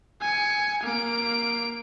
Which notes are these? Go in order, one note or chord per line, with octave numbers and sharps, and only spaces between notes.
G#5 C#7
A#3 D7